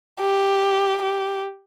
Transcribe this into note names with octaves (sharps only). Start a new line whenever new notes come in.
G4
G4